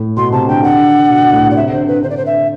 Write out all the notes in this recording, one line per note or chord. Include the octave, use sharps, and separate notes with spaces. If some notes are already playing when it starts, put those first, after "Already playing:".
Already playing: A2
B2 C6
C3 A5
D3 G5
D3 F#5
B2
B2
A2
B2
D5
C3 E5
D3 C5
D3 B4
D3 C5
D5
C5
E5